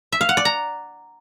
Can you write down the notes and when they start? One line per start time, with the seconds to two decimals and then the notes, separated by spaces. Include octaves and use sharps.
0.12 E5
0.21 F5
0.29 F#5
0.37 D5
0.45 A#5